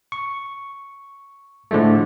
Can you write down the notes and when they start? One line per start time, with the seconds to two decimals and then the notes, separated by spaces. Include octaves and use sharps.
0.12 C#6
1.71 A2 D3 F3 G#3 A3